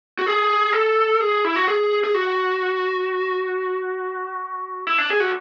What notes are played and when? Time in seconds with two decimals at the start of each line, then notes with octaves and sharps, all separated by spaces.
0.19 F#4
0.26 G#4
0.73 A4
1.21 G#4
1.44 E4
1.56 F#4
1.67 G#4
2.04 G#4
2.14 F#4
4.87 E4
4.98 D4
5.10 G#4
5.20 F#4